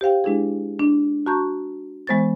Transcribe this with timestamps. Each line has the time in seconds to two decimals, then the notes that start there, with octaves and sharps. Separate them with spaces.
0.01 G4 C5 F5 G5
0.24 G#3 D4 E4 G#4
0.80 D4
1.26 F#4 A5 A#5 C#6 G6
2.07 E3 G#3 B3 C5 C#6 A6